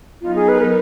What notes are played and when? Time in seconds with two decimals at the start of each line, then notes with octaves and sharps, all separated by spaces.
0.22 F#3 B3 D#4 F4
0.35 G#4
0.48 B4
0.61 A#4